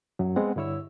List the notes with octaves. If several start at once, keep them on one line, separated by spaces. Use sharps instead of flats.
F#2 F#3
G#3 B3 C4 F#5
G2 D3 E4 C#5 E6